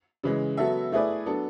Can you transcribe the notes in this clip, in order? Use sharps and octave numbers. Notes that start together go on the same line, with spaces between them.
C#3 E3 G#3
F#3 B3 F#4 A4 E5
A3 E4 G#4 B4 D5
F#3 B3 D4 A4